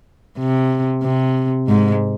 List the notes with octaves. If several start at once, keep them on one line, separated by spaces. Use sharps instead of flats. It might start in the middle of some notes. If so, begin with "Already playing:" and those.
C3
C3
G#2